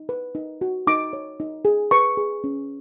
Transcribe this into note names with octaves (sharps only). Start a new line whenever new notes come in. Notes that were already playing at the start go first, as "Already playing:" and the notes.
Already playing: D#4
B4
D#4
F#4
D#4 D6
C#5
D#4
G#4
B4 C#6
G#4
C#4